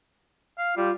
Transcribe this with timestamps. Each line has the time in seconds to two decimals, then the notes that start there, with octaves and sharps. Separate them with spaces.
0.58 F5
0.77 G3 F4